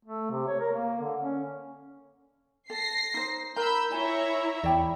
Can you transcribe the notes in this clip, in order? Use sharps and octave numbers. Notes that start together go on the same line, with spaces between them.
A3
C3
C#5
A#4
A#3
D3
C#4
A4 A#6 C7
D#4 C5
A#4 A#5 B5 E6 G6
E4 C#5 E5 G#5 A#5
E2 D5 G5 B5